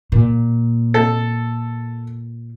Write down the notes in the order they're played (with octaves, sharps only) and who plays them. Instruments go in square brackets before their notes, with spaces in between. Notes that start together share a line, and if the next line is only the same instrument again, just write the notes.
[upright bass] A#2
[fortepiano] A4